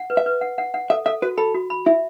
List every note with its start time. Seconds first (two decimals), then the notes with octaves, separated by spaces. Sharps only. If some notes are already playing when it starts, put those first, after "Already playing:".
Already playing: F#5
0.10 B4
0.17 E5
0.26 B4
0.41 F#5
0.58 F#5
0.74 F#5
0.90 A4 E5
1.06 A4 E5
1.22 F#4 B4
1.37 A4 B5
1.54 F#4
1.70 B5
1.86 E4 E5